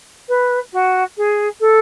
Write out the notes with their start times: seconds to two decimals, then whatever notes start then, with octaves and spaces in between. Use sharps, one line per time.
0.29 B4
0.73 F#4
1.17 G#4
1.60 A4